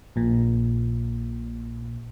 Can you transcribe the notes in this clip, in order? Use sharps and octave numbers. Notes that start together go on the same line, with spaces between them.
A#1 A#2